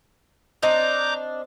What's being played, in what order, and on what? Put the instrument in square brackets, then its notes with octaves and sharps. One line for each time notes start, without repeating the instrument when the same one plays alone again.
[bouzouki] C4 D4 D#5 [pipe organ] A#5 D6 G6